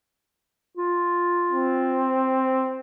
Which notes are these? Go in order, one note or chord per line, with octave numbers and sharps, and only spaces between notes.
F4
C4